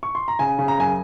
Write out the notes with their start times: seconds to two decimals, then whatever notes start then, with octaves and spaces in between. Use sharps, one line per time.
0.03 C#6
0.15 C6
0.28 A#5
0.39 C#3 G#5
0.59 C#3
0.68 A#5
0.78 F#2 G#5